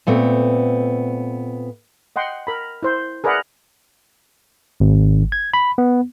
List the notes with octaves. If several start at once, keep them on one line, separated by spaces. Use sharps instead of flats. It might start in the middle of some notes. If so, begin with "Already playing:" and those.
A#2 A3 B3 C4
D#5 F#5 G5 C6
A#4 B5
E4 C5
G#4 A#4 B4 D5 E5 F#5
G#1
G#6
B5
B3